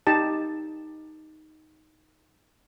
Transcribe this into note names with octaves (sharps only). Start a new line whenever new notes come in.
D#4 G4 A5